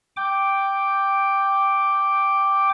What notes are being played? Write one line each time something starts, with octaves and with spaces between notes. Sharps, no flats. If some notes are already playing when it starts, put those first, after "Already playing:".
G5 D6